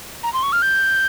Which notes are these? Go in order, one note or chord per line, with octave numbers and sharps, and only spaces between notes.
A#5
C6
C#6
F6
G6